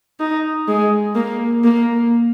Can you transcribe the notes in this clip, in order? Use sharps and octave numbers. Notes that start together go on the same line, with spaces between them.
D#4
G#3
A#3
A#3